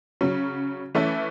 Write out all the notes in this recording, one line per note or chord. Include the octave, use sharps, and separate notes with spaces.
C#3 F#3 C#4
E3 A3 C#4 E4